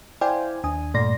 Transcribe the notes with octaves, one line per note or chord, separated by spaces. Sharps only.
E4 C5 D5 F5 G5 G#5
D#2 D4 G#5 D#6
G2 A#2 A3 D5 C6 A#6